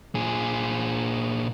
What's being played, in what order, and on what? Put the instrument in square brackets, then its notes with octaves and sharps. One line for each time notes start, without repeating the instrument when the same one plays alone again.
[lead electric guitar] A#2 G#4